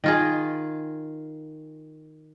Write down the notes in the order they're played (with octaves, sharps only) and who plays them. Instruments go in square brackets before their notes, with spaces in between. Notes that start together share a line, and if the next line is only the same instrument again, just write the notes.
[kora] D#3 F4 G#4